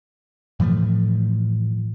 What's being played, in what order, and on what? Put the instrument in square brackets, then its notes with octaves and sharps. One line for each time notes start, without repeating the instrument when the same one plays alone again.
[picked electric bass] A2 E3 F3 A3